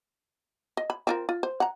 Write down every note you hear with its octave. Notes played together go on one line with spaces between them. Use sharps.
D#5
B5
C4 F4 A#4
F4
C5
F#5 A#5